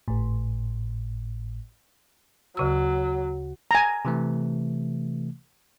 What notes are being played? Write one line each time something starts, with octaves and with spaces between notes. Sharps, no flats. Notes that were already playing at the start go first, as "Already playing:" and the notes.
G#1 A2
D2 C#3 F#3 E6
G#5 A#5
C3 E3 A3